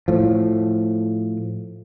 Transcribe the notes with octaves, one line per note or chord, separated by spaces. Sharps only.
A2 F3